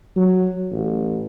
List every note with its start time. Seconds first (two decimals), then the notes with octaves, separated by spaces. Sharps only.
0.17 F#3
0.71 A1